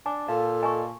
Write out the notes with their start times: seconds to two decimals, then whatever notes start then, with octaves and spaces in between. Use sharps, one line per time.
0.06 D4 G#5 A5 D6
0.28 A#2 A4 F5 A5
0.63 D#5 G#5 A5 C#6